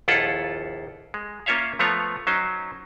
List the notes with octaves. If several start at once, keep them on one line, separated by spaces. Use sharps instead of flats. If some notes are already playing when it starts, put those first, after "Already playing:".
A#1 D#2 E4 F4 A4 F#5
G#3
A#3 C#4 F4 C#5 E5 F5
F3 A3 B3 F4 C#5 A#5
F#3 C#4 D#4 C5